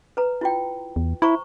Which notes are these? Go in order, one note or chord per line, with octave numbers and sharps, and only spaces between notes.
B4 A#5
E4 F4 G5
E2
E4 C5 A#5 C#6